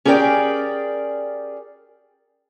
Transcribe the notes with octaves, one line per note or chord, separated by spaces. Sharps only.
C#4 G4 G#4 A#4 D5 G5